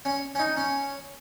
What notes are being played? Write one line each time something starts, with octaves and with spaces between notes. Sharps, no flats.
C#4
C#4
D#4
C#4